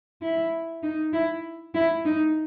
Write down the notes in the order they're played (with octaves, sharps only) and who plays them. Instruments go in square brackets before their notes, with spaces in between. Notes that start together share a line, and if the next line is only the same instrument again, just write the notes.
[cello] E4
D#4
E4
E4
D#4